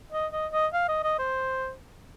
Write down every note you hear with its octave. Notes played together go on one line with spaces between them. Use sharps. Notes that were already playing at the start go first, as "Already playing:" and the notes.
D#5
D#5
D#5
F5
D#5
D#5
C5